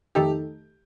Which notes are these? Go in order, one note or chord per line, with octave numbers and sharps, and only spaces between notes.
F2 D#3 A3 D#4 G4 A4